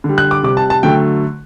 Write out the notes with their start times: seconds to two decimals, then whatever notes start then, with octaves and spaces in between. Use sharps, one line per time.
0.04 D3
0.09 G3
0.18 F#6
0.31 D6
0.43 C3 G3 D6
0.57 A5
0.70 A5
0.83 D3 F#3 A3 G5